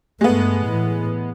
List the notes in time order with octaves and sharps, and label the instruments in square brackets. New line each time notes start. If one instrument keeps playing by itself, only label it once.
[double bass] G2 A3 [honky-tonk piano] G#3 B3
[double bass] A2 E3